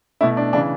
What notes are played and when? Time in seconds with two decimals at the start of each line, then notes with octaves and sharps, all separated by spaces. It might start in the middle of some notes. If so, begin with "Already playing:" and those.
0.21 B2 A3 E4
0.37 D4
0.53 C#3 E3 D4